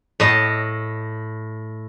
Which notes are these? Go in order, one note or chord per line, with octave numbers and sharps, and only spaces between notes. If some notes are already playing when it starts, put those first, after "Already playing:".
A2 D#5